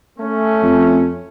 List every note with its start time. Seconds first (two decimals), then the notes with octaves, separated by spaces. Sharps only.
0.19 A3 C#4
0.63 F2